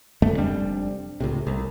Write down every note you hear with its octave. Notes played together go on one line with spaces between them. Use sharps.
F#2 D3 G#3 A3
F1 G3 C4 D4
C#2 A2 C3
C2